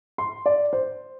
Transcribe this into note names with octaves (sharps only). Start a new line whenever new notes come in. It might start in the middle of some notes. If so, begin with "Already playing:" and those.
C6
D5
C5